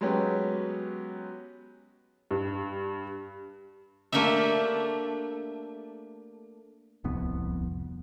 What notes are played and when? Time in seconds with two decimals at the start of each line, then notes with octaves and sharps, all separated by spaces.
0.01 F#3 G#3 B3 C#4 G4
2.31 G2
4.12 A3 A#3 D4 G4 E5
7.04 D1 C2 F2 B3